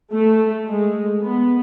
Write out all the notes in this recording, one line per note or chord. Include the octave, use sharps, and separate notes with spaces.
A3
G#3
B3